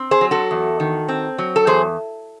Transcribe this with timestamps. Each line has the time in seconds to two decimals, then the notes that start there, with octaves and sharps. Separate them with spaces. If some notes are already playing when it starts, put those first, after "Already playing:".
Already playing: C4
0.11 G#4 C5
0.21 F#3
0.31 F#4 A4
0.51 E2
0.80 D#3
1.09 C4
1.38 F#3
1.56 A4
1.67 E2 G#4 C5